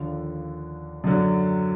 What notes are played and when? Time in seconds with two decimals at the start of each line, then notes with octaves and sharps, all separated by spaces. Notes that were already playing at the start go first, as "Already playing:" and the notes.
Already playing: D#2 D3 F3
1.04 F#2 D3 F#3